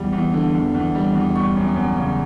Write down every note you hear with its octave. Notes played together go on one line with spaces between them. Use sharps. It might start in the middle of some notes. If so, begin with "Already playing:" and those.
Already playing: E2 G3
E2
D3
E2
E2
G3
E2
G3 C#6
F#2
F#2
C#3